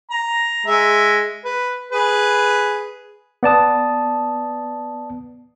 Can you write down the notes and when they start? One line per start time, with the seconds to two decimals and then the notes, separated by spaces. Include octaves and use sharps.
0.11 A#5
0.67 G#3 E5
1.45 B4
1.92 G#4 B4
3.43 B3 D5 A5 D#6